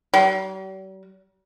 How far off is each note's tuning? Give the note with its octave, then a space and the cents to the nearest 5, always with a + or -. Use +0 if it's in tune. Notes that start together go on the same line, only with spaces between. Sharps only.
G3 -45